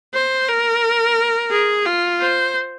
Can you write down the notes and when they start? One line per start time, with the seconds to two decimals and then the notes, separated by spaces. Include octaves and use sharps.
0.13 C5
0.48 A#4
1.50 G#4
1.86 F4
2.19 C5